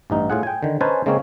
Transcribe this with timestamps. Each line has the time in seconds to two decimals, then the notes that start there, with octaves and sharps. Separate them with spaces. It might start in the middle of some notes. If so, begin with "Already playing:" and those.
0.10 A1 G2 D#4
0.30 A2 F4 G#4 F#5
0.43 G5 G#5
0.63 D3 D#3
0.81 C#4 D#4 B4 C5 G#5 A5
1.06 C#3 G#3 A#3 C4 C#4 C#5